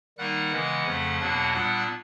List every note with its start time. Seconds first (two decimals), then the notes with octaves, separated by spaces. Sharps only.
0.18 D#3 G3 A#3 D#4 F#5 F#6
0.52 C#3 E3 G#3 B3
0.86 F2 C#3 F3 A3
1.20 E2 B2 F#3 A#3 D4 F#5 F#6
1.54 A#2 G3 B3 D4 F#5 F#6